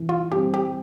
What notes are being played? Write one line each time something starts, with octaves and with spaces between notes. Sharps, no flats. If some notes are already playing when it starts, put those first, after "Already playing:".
Already playing: E3
F4
G3 C4 G4
G4